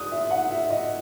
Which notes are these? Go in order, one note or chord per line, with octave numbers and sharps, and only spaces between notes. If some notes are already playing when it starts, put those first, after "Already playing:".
Already playing: D#6 F#6
E5
F#5
E5
D#5